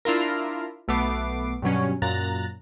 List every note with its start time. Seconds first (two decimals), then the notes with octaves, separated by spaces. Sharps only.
0.05 D4 E4 F4 A#4
0.88 B1 A3 B3 D6 C7
1.62 G2 B2 F#3 C#4
2.02 F#2 A#2 A#5 F#6 A6